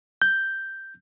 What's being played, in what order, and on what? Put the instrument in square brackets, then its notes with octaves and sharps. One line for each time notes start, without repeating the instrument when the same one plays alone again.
[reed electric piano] G6